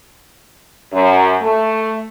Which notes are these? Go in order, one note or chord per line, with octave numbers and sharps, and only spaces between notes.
F#2
A3